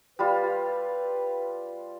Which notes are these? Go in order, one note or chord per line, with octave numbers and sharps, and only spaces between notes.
G3 F4 B4